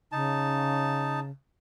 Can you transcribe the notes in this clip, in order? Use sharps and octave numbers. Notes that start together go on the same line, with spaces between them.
C#3 D#4 A5